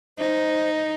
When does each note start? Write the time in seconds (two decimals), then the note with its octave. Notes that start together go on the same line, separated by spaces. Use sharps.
0.19 D#4 C5